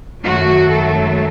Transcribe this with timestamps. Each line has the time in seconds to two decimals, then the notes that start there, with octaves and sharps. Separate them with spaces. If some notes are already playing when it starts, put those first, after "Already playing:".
0.22 F#2 D#3 F#3 A3 F#4
0.68 A4